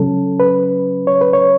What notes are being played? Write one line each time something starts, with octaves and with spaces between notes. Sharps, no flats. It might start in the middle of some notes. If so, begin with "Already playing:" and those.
Already playing: C#3 F#3 C#4 A4
B4
C#5
B4
C#5